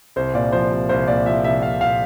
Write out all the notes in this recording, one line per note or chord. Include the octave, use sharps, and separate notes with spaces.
C2 C5
A#2 D5
F3 C5
C2
C2 C5
A#2 D5
F3 E5
C2 E5
C2 F5
A#2 F5